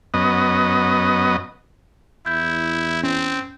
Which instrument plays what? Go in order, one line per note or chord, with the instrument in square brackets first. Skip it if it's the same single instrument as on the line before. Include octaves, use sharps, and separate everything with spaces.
[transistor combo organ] F#2 B3 D#5
[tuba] E2 [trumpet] E4 [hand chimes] G6
[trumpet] C4 [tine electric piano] C#4